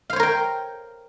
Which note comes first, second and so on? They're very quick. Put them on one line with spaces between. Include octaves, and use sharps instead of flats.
F5 C5 C#5 A#4 G5